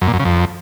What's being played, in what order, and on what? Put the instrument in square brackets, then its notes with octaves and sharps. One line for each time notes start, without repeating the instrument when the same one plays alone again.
[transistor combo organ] F#2
A#2
F#2
C#3
F2